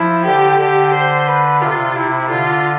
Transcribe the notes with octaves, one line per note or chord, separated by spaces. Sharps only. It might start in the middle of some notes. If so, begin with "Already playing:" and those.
Already playing: F3 E4
D3 G4
D3 G4
C5
B4
C3 F4
C3 E4
D3 F4